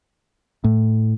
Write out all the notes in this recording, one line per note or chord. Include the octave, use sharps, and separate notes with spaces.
A2